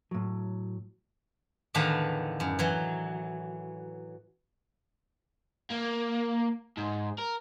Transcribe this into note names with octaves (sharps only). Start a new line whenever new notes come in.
A2 F#3
E2 A2 D3 D#3 B4 F5
F#2
E3 F#3
A#3
G#2
A#4